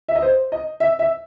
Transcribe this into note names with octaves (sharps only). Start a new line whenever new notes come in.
E5
D#5
C5
D#5
E5
E5